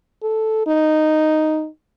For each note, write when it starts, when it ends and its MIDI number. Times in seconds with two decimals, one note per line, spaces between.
0.23 0.64 69
0.67 1.68 63